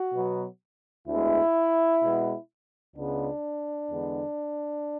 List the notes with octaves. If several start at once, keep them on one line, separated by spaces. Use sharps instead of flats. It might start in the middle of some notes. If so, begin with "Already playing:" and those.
Already playing: F#4
B2 F#3 B3
D2 D3 G#3 B3 E4
B2 G#3 B3
C#2 C#3 G#3 B3 D4
E2 D3 G#3 B3